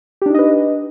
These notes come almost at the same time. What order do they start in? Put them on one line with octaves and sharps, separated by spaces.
G4 D4 D#4 D#5 B4